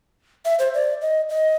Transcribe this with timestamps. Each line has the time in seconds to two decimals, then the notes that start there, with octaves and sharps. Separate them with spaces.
0.45 E5
0.59 C5
0.74 D5
1.02 D#5
1.29 D#5